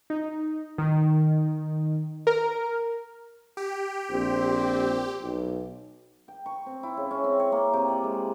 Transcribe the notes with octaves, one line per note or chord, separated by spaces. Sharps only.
D#4
D#3
A#4
G4
A#1 C4
B1
G5
C#6
C4
E4
C#3
C#4
C4
C#5
A#3
C3
D5
G#3